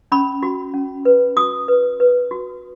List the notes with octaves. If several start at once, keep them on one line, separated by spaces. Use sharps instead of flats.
C#4 B5
F#4
C#4
B4
F#4 D#6
B4
B4
F#4